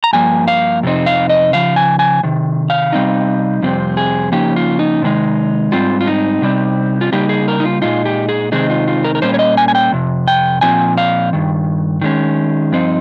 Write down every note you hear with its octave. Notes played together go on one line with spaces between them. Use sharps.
A#5
G2 F3 A#3 G#5
F5
F2 C3 C4 D#4
F5
D#5
C#3 F3 F5
G#5
G#5
C3 D#3
F5
C3 G3 C4 D#4
F2 C3 G3 C4
G#4
C#3 F3 A#3 D#4 G4
F4
D#4
C3 D#3 G#3 D#4
G#2 G3 C4 F4
F4
D#4
C3 G3 C4
F4
C#3 G3 A#3 D#4 G4
G#4
A#4
D#4
F4
A#2 G#3 D#4 F4
G4
G#4
C3 D#3 G#3 C4 D#4 G#4
F4
F4
A#4
A#4
A#2 G3 A#3 C#4 C5
C#5
D#5
G#5
G#5
G5
F2 C3
G5
A#2 F3 C4 G#5
F5
G2 D#3
D#3 G#3 C#4
G2 F3 C4 D#4